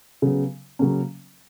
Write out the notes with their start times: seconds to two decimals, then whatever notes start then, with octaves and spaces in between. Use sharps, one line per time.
0.22 C#3 F#3 B3
0.79 C#3 F#3 A#3 C#4